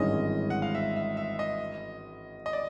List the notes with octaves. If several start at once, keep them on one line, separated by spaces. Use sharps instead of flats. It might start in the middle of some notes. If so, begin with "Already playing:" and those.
Already playing: G#1 G2 E3 G#3 C#4 D#5
F#5
F5
E5
E5
E5
D#5
D#5
D5